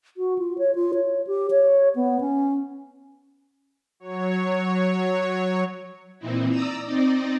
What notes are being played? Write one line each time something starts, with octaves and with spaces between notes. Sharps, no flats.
F#4
F4
C#5
F4
C#5
G4
C#5
B3
C#4
F#3 C#5
A#2 E3 C4 D#4 E4
D5 A#5 D#6 E6
C4 D#4 D5 D#5